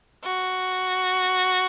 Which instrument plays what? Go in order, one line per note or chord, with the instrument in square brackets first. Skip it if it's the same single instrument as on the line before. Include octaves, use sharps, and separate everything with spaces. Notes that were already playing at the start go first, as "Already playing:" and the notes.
[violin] F#4